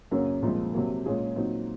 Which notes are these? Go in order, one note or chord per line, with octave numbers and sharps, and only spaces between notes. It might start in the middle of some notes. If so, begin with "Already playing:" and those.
F#2 C#3 F#3 A#3 C#4
C2 A#2 F3 G#3
C3 F#3 A#3
A#2 G#3 C#4 F4 G#4
A#2 F#3 C4 D#4